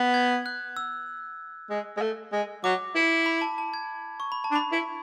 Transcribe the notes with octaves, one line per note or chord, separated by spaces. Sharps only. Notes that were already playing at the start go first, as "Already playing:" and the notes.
Already playing: B3
G#6
F#6
E6
G#3
G#3
A3
G#3
F#3 D6
E4
B5
A5
A5
G#6
C#6
B5
A5
D4
B5
E4